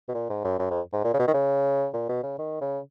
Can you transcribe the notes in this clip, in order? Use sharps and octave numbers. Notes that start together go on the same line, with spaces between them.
B2
A#2
G#2
F#2
F#2
F2
G#2
A#2
C#3
B2
D#3
C#3
A#2
B2
C#3
D#3
C#3